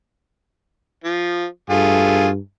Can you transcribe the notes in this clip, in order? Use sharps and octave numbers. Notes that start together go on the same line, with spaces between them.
F3
G2 A3 F4 G#4